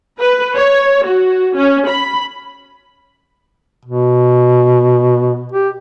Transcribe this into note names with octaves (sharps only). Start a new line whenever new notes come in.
B4
C#5
F#4
C#4
B5
B2
G4